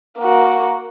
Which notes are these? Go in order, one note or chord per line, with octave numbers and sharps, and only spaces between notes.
A#3 F#4